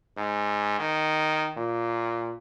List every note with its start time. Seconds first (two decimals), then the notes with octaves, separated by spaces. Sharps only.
0.17 G#2
0.79 D#3
1.57 A#2